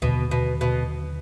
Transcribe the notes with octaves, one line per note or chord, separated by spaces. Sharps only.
D#2 B2 D3 F#3
B2
B2